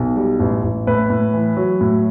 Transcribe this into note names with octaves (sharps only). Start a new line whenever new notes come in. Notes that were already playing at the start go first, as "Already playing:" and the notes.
Already playing: B1
G3
A1
A1
A2 B4
A2
E3
F#3
A2